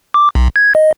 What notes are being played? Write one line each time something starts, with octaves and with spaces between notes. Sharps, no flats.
D6
B1
G#6
D#5